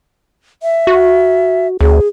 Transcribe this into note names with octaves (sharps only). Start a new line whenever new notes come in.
E5
F#4
D2 G#4